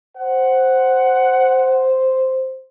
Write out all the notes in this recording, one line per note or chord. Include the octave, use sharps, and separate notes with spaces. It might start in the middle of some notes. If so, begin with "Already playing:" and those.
C5 F#5